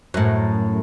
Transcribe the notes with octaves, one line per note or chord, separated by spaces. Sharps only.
F#2 A2